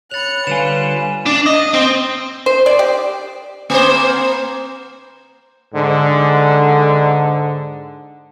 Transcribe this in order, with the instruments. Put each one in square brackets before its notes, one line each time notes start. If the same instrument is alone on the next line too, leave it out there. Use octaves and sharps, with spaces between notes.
[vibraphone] C#5 B5 [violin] F#6 C#7 [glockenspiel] A6 F7
[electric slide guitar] D3 G3 F4 [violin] B4 [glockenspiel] G#5 E7
[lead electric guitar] D4
D#5
C4
[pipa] C5
D5
G4
[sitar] A#3 C5
[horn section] G#2 D3